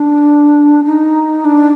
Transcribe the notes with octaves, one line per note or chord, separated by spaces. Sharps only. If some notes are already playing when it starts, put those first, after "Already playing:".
Already playing: D4
D#4
D4